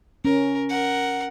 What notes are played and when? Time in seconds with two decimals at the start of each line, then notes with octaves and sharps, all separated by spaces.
0.25 C#4 A#4
0.69 A#4 F#5